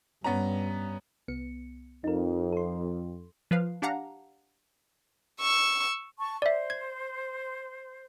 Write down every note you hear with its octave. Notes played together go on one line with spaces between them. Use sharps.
G2 B3 C#4 A#5
C2 B3 C#7
F2 D#4 A#4
A4 C6
F3 B4 F5
D4 G4 F5 F#5 A#5
C#6 E6
A5 C#6
C5 D5 E5
G#6